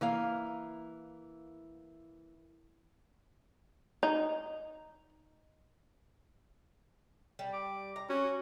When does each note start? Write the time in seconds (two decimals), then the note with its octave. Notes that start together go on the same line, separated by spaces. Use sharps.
0.01 E3 A#3 F5
4.03 D#4
7.39 G3
7.53 D6
7.96 A#5
8.10 C#4 F#4